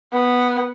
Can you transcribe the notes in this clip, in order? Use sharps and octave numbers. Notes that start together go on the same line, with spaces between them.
B3